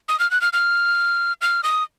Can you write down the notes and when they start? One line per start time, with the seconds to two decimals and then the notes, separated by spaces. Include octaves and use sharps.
0.09 D#6
0.20 F6
0.31 F#6
0.41 F6
0.53 F6
1.41 F6
1.63 D#6